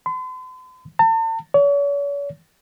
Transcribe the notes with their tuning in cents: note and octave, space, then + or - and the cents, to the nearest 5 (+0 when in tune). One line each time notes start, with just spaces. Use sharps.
C6 -45
A5 +40
C#5 +40